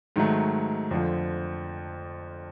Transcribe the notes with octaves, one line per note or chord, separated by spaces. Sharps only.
G#2 D#3 F#3 A3
F2 D3 F3